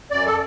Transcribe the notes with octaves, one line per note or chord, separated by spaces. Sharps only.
F#2 D5
A4